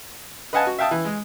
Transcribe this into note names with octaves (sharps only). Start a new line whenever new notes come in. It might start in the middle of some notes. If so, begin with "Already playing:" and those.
B4 D#5 F5 F#5 G#5 A5
F#4
E5 F5 G5 A5 D#6
E3
G#3